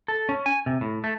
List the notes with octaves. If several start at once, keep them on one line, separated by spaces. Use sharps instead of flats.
A4
C#4
G#5
C3
A2
A3